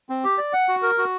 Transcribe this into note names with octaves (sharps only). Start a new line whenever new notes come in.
C4
G4
D5
F#5
F#4
A#4
F#4